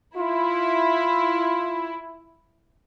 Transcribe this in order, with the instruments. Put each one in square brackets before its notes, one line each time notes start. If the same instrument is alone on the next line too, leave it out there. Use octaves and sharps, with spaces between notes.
[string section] E4 [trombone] F4